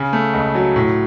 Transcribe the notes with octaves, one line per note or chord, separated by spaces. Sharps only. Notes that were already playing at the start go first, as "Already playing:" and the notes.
Already playing: C#3
A3
C#2
F#3
A2